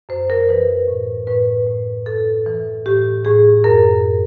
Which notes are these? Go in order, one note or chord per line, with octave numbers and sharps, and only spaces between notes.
F#2 C5
A#4
E3 B4
A2
A2 B4
A2
A2 A4
E3
A2 G4
A2 G#4
F#2 A#4